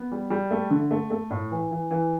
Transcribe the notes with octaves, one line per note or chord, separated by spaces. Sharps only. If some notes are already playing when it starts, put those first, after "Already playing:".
Already playing: B3
G3
G3
A3
D3
A3
A3
A2
E3
E3
E3